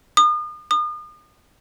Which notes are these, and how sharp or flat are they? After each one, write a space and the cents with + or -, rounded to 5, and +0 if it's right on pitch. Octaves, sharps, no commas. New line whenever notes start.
D#6 -40
D#6 -40